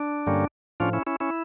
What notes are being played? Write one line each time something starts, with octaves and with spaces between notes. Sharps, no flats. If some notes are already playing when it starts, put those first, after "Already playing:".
Already playing: D4
G2 D3 G3 A#3 C#4
A2 F3 C#4 D4 F4
C#4 E4
C#4 E4
C#4 E4